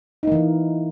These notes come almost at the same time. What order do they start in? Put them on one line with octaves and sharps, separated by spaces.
D#4 A#3 E3